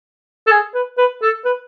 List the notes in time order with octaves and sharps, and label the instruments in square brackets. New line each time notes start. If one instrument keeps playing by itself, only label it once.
[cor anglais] A4
G#4
B4
B4
A4
B4